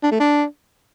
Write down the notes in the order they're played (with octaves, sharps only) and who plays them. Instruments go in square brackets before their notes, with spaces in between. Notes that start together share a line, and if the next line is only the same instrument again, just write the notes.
[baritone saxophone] D4
A3
D4